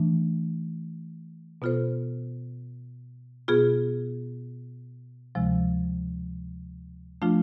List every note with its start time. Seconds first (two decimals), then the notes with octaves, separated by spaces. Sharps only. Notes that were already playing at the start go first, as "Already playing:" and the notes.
Already playing: E3 A3 D4
1.62 B2 B3 F4 A4 C5
3.48 B2 B3 F4 G#4
5.35 D2 C3 F3 G#3
7.22 F3 A3 D4 F4